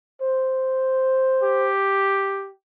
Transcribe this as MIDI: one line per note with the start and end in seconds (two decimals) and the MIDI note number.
0.22 1.69 72
1.43 2.50 67